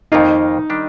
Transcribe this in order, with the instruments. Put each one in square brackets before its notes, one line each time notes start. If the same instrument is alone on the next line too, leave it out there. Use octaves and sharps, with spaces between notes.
[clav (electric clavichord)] F2 D#3 A#3 F4 [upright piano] D#4
[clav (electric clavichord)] D#3 G3 D4 G4